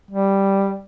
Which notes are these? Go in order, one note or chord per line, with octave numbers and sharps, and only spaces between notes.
G3